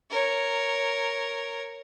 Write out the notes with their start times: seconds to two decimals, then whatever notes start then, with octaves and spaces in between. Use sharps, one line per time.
0.10 A#4 C#5